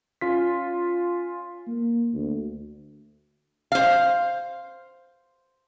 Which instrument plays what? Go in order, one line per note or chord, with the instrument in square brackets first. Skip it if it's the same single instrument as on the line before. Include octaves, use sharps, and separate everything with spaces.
[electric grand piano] C#4 F4 B6
[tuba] A#3
D2
[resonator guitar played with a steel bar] C5 F5